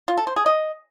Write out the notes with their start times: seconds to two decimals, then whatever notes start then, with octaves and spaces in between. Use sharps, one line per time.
0.08 F4
0.17 A4
0.27 C5
0.36 G#4
0.46 D#5